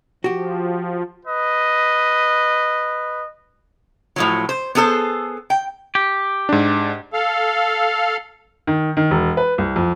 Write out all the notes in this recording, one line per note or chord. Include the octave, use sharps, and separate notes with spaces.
F3 F#4 G4
B4 D#5
A2 F3 F#3
C5
B3 G#4 A4 C5
G5
G4
G#2 D4
A4 F5
D#3
D#3
E1
B4
C2
F2